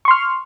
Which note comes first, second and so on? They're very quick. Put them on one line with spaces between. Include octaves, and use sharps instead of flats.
C#6 C6 F6